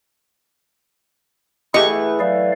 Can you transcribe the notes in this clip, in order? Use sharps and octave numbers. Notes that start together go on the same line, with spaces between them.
E3 A3 E4 G4 G#4 D#5 F#5 C#6
F#3 D5 F5